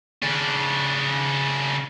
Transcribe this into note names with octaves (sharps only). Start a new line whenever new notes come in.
C#3 D4